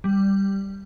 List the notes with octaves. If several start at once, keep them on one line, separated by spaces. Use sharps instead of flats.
G3